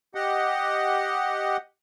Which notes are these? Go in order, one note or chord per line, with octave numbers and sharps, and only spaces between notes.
G4 D#5 F#5